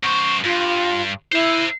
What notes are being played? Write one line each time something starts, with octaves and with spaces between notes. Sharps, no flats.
F#2 C5 C#6
G2 F4
E4 C5 E5